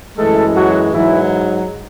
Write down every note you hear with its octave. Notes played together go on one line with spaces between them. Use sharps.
F#2 E3 G#3 A3 A4
F#3 F#4
G#2 E3 F#3 E4